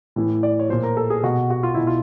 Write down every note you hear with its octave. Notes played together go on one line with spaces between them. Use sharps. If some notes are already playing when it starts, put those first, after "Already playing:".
A2 E3
D5
C#5
A#2 F3 C5
A#4
A4
G#4
B2 F#4
F#4
F4
B2 E4
F4